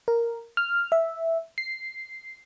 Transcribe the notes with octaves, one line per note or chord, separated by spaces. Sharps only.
A#4
F6
E5
C7